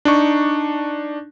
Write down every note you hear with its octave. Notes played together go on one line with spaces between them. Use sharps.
D4 D#4 C#6